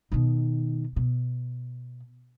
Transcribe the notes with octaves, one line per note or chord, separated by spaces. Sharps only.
B2 D#3
B2